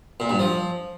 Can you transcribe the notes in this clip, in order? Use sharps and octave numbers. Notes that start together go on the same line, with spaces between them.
A#2
G2
F3